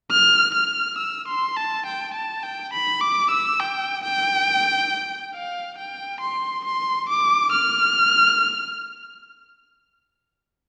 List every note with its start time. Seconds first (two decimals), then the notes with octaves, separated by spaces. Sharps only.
0.11 F6
0.55 F6
0.99 E6
1.28 C6
1.57 A5
1.86 G5
2.14 A5
2.43 G5
2.73 B5
3.01 D6
3.31 E6
3.60 G5
4.04 G5
5.34 F5
5.78 G5
6.21 C6
6.65 C6
7.09 D6
7.52 F6